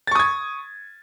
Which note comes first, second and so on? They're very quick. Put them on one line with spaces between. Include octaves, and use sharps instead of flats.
A6 C#6 D#6 G#6